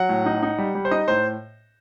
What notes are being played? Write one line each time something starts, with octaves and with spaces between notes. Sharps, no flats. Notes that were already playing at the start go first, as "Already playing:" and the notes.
Already playing: F#3 F#5
A2
D#4
D#4
G3
G3
C5
D#4 D#5
A2 C5